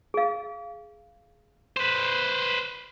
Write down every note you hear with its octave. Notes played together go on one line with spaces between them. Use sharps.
G#4 F5
B4 C5